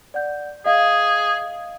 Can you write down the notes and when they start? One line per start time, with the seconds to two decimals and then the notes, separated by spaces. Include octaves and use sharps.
0.14 D5 F#5 G6
0.65 G#4 D#5 F5